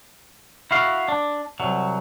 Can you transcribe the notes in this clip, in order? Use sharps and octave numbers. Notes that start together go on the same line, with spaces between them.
E4 F#4 F5
D4
C2 F#3